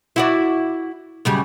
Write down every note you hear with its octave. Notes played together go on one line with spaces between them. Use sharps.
E4 F#4 D5
F#2 C#3 G3